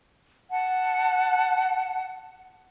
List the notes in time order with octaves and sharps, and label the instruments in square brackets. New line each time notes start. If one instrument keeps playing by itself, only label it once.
[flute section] F#5 A5